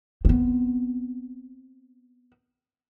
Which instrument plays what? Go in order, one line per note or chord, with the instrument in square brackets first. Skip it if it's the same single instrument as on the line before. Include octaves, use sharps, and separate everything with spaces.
[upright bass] B3 C4